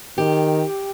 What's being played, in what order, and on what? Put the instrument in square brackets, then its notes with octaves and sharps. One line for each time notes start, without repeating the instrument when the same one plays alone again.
[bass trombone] D#3 [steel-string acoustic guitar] G4